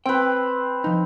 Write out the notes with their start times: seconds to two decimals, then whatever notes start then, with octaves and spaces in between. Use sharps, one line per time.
0.06 C4 B4 G5
0.84 F3 D#4